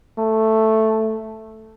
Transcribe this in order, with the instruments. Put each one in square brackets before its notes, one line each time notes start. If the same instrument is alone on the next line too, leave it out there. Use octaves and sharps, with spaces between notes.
[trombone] A3